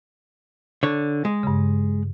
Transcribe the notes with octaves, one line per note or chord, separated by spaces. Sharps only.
D3 C#5
G#3
G2 C#3